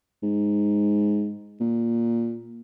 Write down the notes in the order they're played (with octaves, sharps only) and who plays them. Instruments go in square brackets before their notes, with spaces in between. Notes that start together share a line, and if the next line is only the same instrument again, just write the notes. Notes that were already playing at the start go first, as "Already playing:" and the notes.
[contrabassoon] G#2
A#2